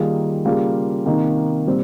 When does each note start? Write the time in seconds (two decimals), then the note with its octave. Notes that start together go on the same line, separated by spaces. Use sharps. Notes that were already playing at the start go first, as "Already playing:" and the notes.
Already playing: D#3 G3 A#3 F4 G#4
0.45 C#3 G3 A#3 F4 G#4
1.06 C3 D#3 A#3 D#4
1.66 A#2 G3 C4